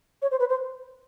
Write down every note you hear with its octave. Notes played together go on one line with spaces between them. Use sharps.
C#5
C5
B4
C5